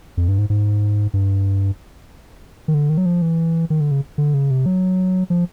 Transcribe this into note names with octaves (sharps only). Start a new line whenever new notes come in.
F2
G2
G#2
G#2
G2
D#3
D3
D#3
F#3
F3
E3
D#3
D3
C#3
D3
C#3
C3
F#3
F3